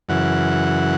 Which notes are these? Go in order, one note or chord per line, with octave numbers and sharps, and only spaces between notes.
F#2 C#3 E3 F#5